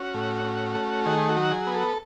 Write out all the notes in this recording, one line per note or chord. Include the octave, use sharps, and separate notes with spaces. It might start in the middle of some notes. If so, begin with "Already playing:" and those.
Already playing: C#4 F#4
A2
C#4
A3
D#3 G#4
F#4
F#3
G#4
B3
A4